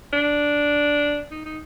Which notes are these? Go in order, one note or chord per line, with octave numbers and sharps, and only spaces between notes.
D4
D#4
D#4